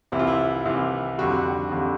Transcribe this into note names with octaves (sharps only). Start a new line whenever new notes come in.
C2 C3 E3 E4
F4
E4
C2 C3 E3
F2 D3 G3 F#4
F2 D3 G3